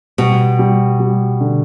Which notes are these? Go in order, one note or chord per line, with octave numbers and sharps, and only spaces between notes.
B2 G3
G3
G3
D3